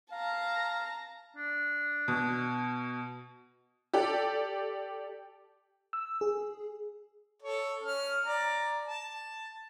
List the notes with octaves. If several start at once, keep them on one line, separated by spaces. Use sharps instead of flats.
F5 A5 A#5
D4
B2
G4 A4 D5 G5
E6
G#4
A4 C#5
C#4 F6
D5 A#5
A5